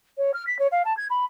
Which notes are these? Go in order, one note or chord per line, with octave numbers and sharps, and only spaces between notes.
C#5
F6
B6
C#5
F5
A5
G#6
B5